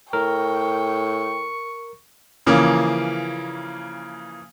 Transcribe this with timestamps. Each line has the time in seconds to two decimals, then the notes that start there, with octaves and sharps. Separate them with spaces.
0.13 A2 A#4 G5 C#6
2.47 C#3 E3 F3 A#3